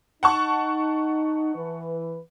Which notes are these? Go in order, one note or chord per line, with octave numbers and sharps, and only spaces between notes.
D#4 F#5 A5 C#6
E3 B4